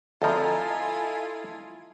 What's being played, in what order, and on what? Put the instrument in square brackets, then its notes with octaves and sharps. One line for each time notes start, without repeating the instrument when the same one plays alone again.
[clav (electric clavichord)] D2 F3 [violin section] E4 F4 [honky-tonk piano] A4 D#5 A#5 [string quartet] G#5